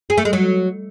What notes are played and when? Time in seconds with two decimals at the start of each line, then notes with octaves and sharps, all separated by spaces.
0.10 G#4
0.18 A3
0.25 G#3
0.33 F#3